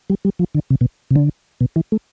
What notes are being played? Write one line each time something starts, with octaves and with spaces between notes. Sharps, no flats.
G3
G3
F3
D3
C3
B2
C3
D3
B2
E3
A3